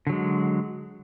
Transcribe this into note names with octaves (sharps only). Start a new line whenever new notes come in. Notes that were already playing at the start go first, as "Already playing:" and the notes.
D3 F#3 G#3